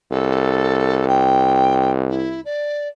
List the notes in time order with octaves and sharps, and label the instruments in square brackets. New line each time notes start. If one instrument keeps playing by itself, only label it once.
[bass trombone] C2 [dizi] A4
[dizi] G5
E4
D5